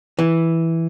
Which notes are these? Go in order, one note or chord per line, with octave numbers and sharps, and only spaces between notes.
E3